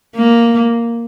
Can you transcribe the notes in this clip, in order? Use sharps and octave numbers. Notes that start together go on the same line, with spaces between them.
A#3